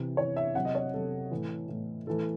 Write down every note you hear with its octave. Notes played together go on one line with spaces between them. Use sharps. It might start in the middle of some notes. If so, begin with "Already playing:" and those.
Already playing: C3 E3
C3 E3 C#5
E5
C3 F#3 F#5
D#5
C#5
C3 F#3 A4
A2 E3
A2 E3
A2 E3 A4